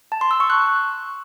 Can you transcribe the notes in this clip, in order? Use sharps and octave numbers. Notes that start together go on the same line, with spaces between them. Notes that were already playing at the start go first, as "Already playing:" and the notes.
A5
C6
E6
C#6
F#6